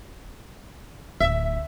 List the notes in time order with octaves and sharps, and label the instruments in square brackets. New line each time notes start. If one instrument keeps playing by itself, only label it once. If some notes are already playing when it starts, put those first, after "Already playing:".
[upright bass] D1 [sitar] E5